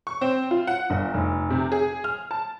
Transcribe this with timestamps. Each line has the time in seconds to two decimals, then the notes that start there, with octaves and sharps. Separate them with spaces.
0.07 C#6
0.21 C4
0.51 F4
0.67 F#5
0.90 G1
1.14 F1
1.50 C3
1.72 G#4
2.04 F6
2.31 A5